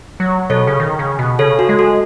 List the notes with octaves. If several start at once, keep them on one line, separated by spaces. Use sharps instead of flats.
F#3
B2 A4 C#5
C#3
D#3
C#3
B2
C#3 A4 C#5
F#4 A4
G#3
F#4 A4